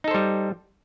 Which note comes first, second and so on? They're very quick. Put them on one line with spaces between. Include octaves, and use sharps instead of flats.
D#4 A4 C5 G3